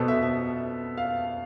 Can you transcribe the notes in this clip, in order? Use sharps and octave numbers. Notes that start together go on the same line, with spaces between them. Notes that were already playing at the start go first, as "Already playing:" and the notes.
Already playing: B2 B3 A4 C5
E5
E5
F5